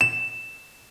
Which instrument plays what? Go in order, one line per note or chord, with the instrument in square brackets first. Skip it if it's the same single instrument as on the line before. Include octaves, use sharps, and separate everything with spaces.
[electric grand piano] E7